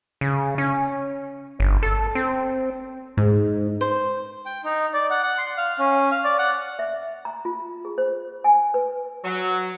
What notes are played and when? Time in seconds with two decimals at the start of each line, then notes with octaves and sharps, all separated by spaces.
0.21 C#3
0.58 C#4
1.60 G1
1.83 A4
2.15 C4
3.17 G#2
3.81 C5
4.46 G5
4.64 D#4
4.94 D5
5.10 F#5
5.23 F#5
5.38 C6
5.57 F5
5.79 C#4
6.11 F5
6.24 D5
6.39 F#5
6.79 E5
7.25 A#5
7.45 F4
7.85 G#4
7.98 C5
8.44 G#5
8.74 B4
9.24 F#3